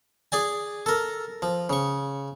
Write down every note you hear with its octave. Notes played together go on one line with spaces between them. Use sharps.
G#4 D5 G#5
A4 A#4
F3
C#3 C#6